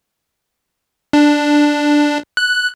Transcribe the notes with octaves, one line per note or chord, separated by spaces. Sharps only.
D4
F#6